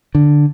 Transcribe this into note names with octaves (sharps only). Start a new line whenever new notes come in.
D3